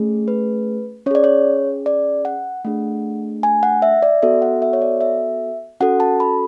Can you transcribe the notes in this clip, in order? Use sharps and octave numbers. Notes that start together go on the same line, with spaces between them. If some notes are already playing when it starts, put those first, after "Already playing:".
Already playing: A3 C#4 G#4
B4
C#4 G#4 C#5 D5
C#5
D5
F#5
A3 D4 G#4 F#5
G#5
F#5
E5
D5
B3 F#4 A4 E5
F#5
E5
C#5
D5
E5
C#4 F#4 A4 F#5
A5
B5